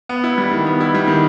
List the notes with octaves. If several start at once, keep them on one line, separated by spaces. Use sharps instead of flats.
B3
E4
G3
D#3
B3
E4
G3
D#3